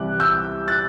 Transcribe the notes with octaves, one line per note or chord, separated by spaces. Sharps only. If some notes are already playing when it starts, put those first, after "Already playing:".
Already playing: C2 C3 E3 G3 D6 F#6
E6 G6
F#6 A6